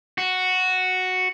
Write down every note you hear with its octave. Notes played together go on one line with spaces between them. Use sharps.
F#4